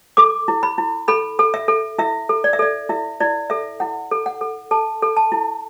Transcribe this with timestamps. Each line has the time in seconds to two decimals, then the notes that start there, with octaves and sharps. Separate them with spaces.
0.17 A4 D6
0.48 E4
0.63 B5
0.78 E4
1.08 A4 B5
1.39 A4
1.54 E5
1.68 A4
1.99 E4 E5
2.29 A4
2.44 D5
2.53 E5
2.59 A4 D5
2.89 E4 E5
3.20 E4 D5
3.50 A4 E5
3.80 E4 F#5
4.11 A4
4.26 F#5
4.41 A4
4.71 A4 A5
5.02 A4
5.17 A5
5.32 E4